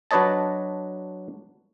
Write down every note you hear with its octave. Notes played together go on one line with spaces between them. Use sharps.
F#3 D4 B4 C#5 D#5 A5